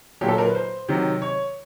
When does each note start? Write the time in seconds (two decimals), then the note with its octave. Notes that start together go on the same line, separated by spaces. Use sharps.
0.21 A#2 F#3 G4
0.29 A4
0.38 A#4
0.46 B4
0.55 C5
0.88 C3 D#3 F#3
1.22 C#5